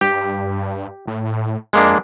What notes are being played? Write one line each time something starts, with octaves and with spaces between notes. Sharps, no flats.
G2 G4
A2
F2 G#3 A#3 D4